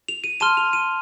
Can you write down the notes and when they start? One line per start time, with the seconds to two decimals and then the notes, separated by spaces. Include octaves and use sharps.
0.08 F7
0.24 D#7
0.40 A5 C6 F6 D#7
0.57 F7
0.73 D#7